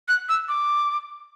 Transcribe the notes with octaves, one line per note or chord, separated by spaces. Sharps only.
F#6
E6
D6